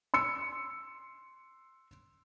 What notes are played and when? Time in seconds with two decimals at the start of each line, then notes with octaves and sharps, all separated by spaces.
0.14 C6 E6 C#7